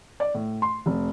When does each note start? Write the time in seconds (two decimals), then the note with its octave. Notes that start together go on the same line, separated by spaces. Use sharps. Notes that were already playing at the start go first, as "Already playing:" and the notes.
0.20 D5
0.34 A2
0.62 C6
0.86 F1